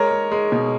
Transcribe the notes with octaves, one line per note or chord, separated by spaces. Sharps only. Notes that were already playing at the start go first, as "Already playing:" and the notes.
Already playing: G#3 A#4 C#5
G#3
G#3
B2